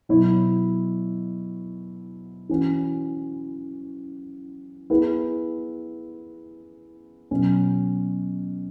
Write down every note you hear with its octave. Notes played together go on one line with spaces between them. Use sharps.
B2 F#3 E4 C#5
E3 C#4 F#4
B3 E4 G#4 B4
B2 F#3 C#4